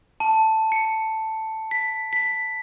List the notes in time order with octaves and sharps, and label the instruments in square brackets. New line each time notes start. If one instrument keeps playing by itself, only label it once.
[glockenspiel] A5
C#7
B6
B6